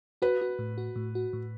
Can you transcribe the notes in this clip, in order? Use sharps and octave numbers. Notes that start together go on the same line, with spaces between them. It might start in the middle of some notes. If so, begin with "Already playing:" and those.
F#4 B4
F#4
A2
F#4
A2
F#4
A2